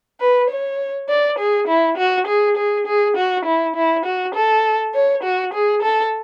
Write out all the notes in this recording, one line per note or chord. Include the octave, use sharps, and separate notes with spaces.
B4
C#5
D5
G#4
E4
F#4
G#4
G#4
G#4
F#4
E4
E4
F#4
A4
C#5
F#4
G#4
A4